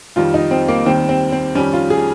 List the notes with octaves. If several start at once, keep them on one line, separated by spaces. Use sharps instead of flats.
F2 D#3 G3 F4
D#4
C4
A#3
D#2 D#3 G3 C4
C4
C4
F2 D#3 G3 C#4
F4
G#4